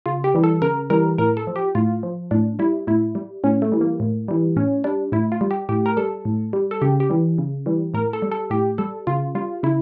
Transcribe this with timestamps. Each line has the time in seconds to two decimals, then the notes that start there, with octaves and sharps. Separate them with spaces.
0.06 C#3 F4
0.24 G4
0.34 E3 G3
0.44 A4
0.62 C#3 A#4
0.90 E3 G3 A#4
1.18 A2 A#4
1.37 A4
1.47 F3
1.56 G4
1.75 A2 F4
2.03 F3
2.31 A2 D4
2.59 G3 E4
2.87 A2 E4
3.15 G3
3.44 A2 C#4
3.62 A3
3.72 E3 G3
3.81 A#3
4.00 A2
4.28 E3 G3
4.56 A2 C#4
4.84 G3 D4
5.12 A2 E4
5.32 F4
5.41 G3
5.51 G4
5.69 A2 G4
5.86 A#4
5.97 G3 A4
6.25 A2
6.53 G3
6.71 A4
6.82 C#3 G4
7.00 G4
7.10 E3 G3
7.38 C#3
7.66 E3 G3
7.94 A2 A#4
8.13 A4
8.22 G3
8.32 A4
8.50 A2 G4
8.78 G3 A4
9.07 C#3 F4
9.35 G3 F4
9.63 C#3 E4